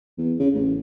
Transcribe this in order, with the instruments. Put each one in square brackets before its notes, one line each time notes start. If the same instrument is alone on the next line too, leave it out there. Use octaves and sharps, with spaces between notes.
[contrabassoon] E2
C#3
A1